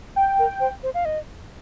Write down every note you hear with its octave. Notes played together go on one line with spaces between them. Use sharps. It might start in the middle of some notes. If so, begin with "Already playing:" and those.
G5
A#4
C5
C5
F5
D#5